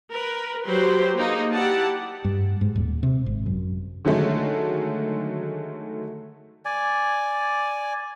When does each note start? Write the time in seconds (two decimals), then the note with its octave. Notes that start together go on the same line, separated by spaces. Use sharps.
0.11 A#4 B4
0.65 F#3 G4 B4 C5 C6
1.15 A#3 D#4 G#4
1.51 E4 G4 D5 F#5 A5
2.24 G2
2.61 G#2
2.76 D#1
3.03 C3
3.26 G#1
3.46 F#2
4.05 D3 D#3 F#3 G#3 A3
6.65 D5 G#5